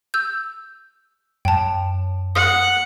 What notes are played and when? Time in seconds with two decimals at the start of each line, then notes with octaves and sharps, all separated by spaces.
0.14 E6 G6
1.45 F#2 G5 A5
2.35 F#5 D#6